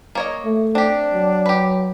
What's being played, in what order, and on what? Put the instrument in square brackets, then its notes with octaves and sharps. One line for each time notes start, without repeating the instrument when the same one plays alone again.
[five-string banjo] A#3 C#5 D#5
[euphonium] A3
[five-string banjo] C4 G4 [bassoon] D4
[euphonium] F#3
[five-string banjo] G4 B4